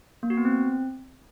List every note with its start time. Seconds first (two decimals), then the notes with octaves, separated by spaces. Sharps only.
0.23 A#3
0.30 F#4
0.38 B3
0.45 C4